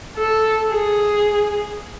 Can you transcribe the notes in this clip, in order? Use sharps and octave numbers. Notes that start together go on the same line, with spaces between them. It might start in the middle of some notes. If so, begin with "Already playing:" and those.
A4
G#4